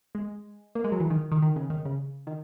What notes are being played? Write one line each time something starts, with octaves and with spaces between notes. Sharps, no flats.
G#3
A#3
G#3
F#3
E3
D#3
D#3
D#3
C#3
D#3
C#3
D#3